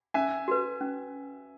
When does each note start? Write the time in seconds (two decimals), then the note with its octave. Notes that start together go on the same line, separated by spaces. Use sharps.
0.14 C#4 E5 G#5
0.48 F#4 B4
0.81 C#4